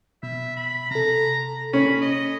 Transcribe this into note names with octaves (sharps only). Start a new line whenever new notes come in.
B2 E5
B5
C3 A4 A#5
C#4 B5
D#5